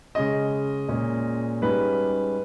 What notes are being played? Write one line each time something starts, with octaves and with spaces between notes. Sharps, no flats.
C#3 G#3 C#4 D#5
A#2 G#3 C#4
G#2 G3 C#4 B4